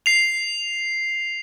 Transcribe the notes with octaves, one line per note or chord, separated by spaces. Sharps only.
C7 F7